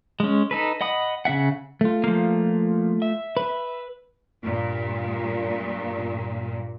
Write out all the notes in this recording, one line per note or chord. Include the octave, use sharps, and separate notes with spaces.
G#3 C#4
D#4 A4 B4
D#5 F#5 B5 D#6
C#3 D4 E5 F#5
A3 F4
F3 A#3
E5
B4
G2 A#2